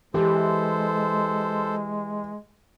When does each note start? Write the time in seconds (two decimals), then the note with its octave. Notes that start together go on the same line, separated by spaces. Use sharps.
0.14 E3 G#3 G4 A4 C5